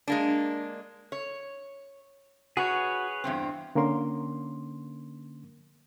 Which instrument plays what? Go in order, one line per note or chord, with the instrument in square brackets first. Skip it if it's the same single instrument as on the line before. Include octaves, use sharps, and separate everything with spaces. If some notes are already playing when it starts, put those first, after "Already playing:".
[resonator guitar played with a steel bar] G#3 A#3 D4
C#5
[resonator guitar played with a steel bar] F#4 [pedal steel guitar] G#4 B4 C#5
[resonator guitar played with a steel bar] E2 G2 C4
[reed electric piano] D3 A#3 C#4 A#4 C6